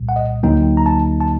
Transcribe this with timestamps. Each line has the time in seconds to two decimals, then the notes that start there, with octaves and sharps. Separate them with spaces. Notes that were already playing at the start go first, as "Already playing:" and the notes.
Already playing: C2 A#2 G3
0.09 F#5
0.16 D#5
0.43 D2 D3 F#3 A#3 D#4 G5
0.77 A#5
0.86 A5
1.21 A5